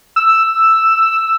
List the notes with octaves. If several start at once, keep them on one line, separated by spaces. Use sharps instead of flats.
E6